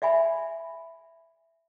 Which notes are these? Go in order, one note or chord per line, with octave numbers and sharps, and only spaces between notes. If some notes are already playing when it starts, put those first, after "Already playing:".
D5 E5 G#5 B5